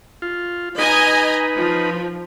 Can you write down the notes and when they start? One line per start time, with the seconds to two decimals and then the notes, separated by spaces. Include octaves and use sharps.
0.22 F4
0.78 D#4 B4 D#5 G#5 A#5
1.56 F3